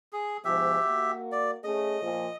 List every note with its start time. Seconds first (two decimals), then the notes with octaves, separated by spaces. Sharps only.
0.13 G#4
0.45 G#2 B2 F3 G4 E5
0.85 A#3 F#4
1.32 D5
1.64 A3 C#4 G#4 D#5
2.01 A#2 F3